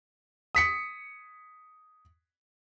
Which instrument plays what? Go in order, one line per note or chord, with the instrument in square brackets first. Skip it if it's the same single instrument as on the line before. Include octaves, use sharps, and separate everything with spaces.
[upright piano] D#6 B6 C#7